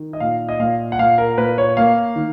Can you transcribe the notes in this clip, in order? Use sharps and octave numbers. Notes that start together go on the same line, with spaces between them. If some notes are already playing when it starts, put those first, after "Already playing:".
Already playing: D#3
D#5
A#2 F5
D#5
A#2 F5
F#5
A#2 F5
A#4
A#2 B4
C#5
A#3 F5
D#3